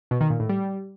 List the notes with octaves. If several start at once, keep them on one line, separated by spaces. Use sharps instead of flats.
B2
D#3
A#2
A2
G3